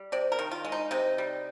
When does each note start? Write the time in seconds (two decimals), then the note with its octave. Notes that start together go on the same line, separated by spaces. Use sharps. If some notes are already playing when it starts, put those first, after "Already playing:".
Already playing: G3
0.12 C3 D5
0.32 A#4
0.39 D#3
0.51 F4
0.65 G#3
0.72 D#4
0.91 C3 D#4
1.18 G3